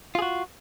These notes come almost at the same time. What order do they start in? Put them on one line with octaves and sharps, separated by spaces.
F4 G#4 F#4